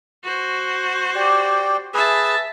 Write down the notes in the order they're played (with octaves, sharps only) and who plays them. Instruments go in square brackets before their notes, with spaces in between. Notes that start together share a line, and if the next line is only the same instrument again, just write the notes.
[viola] F#4 C5
[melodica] G4 D5
[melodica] G#4 B4 [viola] E5 A5